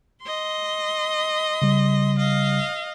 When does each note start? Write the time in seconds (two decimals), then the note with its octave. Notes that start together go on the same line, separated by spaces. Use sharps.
0.22 D#5 C6
1.62 C#3 G3
2.18 D#5 F5